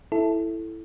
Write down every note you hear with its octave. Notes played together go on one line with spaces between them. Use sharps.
E4 A4